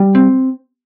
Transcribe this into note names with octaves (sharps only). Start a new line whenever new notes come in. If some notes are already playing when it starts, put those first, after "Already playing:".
Already playing: G3
C4